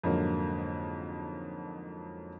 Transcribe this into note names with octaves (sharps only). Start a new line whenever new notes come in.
F2 G#2 D3 F#3 A#3